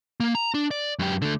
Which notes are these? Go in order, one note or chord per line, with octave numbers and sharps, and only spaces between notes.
A#3
A#5
D4
D5
F#2 G4
D3 A3